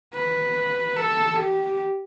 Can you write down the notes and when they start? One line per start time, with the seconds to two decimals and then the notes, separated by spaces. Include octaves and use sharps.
0.14 B4
0.96 A4
1.37 G4